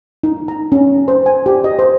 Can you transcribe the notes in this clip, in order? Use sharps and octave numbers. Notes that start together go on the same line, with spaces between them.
D#4
A#5
C#4
C5
G#5
G4
D#5
C5